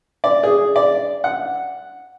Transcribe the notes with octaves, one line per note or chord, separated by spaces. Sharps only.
D5
G#4
D5
F#5